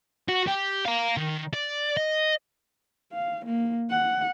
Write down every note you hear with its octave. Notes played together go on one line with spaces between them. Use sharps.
F#4
G4
F5 A#5
D#3
D5
D#5
F5
A#3
F#5